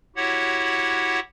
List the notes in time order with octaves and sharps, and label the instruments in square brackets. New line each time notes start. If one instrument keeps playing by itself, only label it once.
[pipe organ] E4 F#4 G4 C#5 F#5